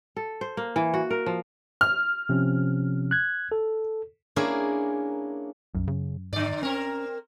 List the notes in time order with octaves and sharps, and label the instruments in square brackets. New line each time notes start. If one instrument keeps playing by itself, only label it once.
[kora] A4
C5
A#3
E3
F#4
A#4
F3
[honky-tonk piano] F6
[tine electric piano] C3 F3 C#4
F#6 G#6
A4
[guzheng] A#3 C#4 D4 E4 G#4 A#4
[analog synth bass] C2 [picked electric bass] F#2
[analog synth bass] C#3
[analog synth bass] G#2 [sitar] D3 D5
[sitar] C4 A#4 [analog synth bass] C#4